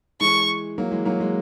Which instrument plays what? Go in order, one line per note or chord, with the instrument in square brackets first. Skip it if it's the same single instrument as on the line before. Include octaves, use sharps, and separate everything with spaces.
[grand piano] E3 G#3 [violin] C#6
[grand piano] F#3 A#3
E3 G#3
F#3 A#3
G#3